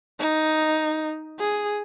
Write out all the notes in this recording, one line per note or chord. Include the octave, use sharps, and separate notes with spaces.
D#4
G#4